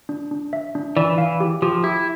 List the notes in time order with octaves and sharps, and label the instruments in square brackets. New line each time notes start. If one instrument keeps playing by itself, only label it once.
[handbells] D4
D4
E5
D4
[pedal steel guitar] E3 [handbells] D5
[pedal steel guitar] E3 [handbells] F5
[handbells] G4
[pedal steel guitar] F3 [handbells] G4
[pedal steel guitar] E4 [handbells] G4